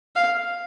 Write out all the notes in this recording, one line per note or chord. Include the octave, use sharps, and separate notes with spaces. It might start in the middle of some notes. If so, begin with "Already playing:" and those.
F5